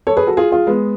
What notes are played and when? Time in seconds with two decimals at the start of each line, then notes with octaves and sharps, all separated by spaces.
0.07 A4 C#5
0.17 G#4 B4
0.27 F#4 A4
0.37 F4 G#4
0.52 F4 G#4
0.67 G#3 B3